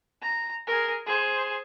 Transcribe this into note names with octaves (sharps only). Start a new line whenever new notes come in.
A#5
G#4 A#4
G#4 C5